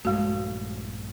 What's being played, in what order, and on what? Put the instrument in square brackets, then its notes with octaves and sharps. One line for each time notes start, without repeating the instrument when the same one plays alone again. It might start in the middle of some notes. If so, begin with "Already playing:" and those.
[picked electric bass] A#1 G2 A3 [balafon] G#3 F#4